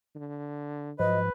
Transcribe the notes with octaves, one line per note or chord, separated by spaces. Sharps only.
D3
G#2 F3 F#3 B4 D#5